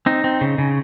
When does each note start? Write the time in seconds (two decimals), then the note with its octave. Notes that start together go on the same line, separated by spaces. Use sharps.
0.06 C4 D#4
0.24 C4
0.41 C#3
0.58 C#3